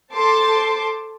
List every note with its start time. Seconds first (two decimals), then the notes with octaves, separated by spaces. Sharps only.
0.12 A4 C5 A5 C6 D6